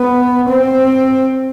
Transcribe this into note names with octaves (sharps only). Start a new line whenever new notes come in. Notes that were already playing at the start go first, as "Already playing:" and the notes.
Already playing: B3
C4